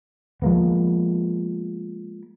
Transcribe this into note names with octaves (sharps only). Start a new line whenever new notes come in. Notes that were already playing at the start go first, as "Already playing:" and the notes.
F3 G#3 A#3 B3